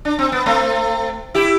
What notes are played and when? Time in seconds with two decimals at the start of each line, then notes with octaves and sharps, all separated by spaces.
0.05 D4
0.19 C4
0.32 B3
0.46 A3 C4
1.34 E4 G4